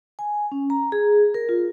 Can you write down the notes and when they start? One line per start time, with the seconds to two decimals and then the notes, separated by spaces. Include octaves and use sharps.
0.19 G#5
0.52 C#4
0.70 A#5
0.92 G#4
1.34 A#4
1.49 F4